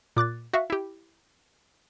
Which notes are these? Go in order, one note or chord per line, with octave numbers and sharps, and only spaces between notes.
A#2 D6 F#6 A6
F#4 E5 F5 C#6
E4 G4